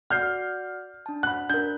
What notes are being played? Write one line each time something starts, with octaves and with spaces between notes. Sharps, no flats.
F#4 D5 F#5 F6 G6 C7
D4 A5
F#5 B5 F#6
D4 A#4 G6